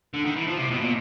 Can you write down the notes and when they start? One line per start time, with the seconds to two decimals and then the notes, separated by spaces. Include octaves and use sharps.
0.14 D3
0.25 D#3
0.36 E3
0.47 F3
0.58 C3
0.71 B2
0.81 A#2